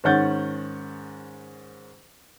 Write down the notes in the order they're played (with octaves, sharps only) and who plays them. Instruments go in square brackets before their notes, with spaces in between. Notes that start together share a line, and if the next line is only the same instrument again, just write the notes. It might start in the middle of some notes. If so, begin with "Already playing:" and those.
[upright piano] G#2 D#3 C#4 F#5 G6 A6